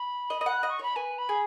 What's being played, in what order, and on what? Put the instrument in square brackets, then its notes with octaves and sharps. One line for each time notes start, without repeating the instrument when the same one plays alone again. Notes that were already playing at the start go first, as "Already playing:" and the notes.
Already playing: [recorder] B5
[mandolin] D#5
D#5
F#5
D#5
[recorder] C#6
[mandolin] C#5 [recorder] B5
[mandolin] B4 [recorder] G#5
[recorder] B5
[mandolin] G#4